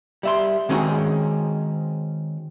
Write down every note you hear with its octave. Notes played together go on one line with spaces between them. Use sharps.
G3 E5 C6
D#3 G#3 C4 C#4 F#4 G#4